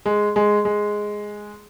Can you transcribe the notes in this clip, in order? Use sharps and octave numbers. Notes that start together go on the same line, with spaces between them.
G#3
G#3
G#3